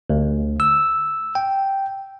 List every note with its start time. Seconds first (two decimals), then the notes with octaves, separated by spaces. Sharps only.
0.10 D2
0.60 E6
1.35 G5